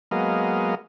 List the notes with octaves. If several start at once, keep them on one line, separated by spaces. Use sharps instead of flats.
F#3 G#3 A#3 B3 D#5 F5